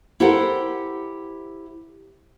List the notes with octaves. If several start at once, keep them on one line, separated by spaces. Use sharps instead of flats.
E4 G4 A4 A#4 C5 F#5